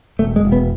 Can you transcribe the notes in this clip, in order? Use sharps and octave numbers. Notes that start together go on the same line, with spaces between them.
E1 A3
G#3
E1
B3